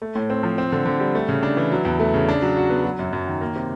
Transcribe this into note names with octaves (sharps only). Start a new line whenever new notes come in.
A3
A2
C4
F3
C4
D3
D3
G3
A3
C#3
D4
E3
F#3
E2
A3
C#3
D4
F#3
F#4
B3
F#3
F#2
F#2
D#3
A#3
C3